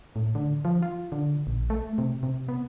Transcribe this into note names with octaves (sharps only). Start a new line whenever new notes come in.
A2
D3
F3
F4
D3
A#1
A3
C3
C3
B3